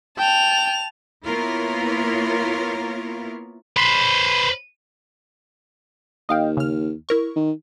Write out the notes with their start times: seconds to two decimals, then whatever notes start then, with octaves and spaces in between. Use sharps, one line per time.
0.18 G5 A5 F7
1.25 A#3 B3 E4 F4 A#4 C#5
3.77 B4 C5
6.29 D#2 D#5 F5 G5
6.57 C#3 F6
7.09 E4 A#4 C#6
7.36 D#3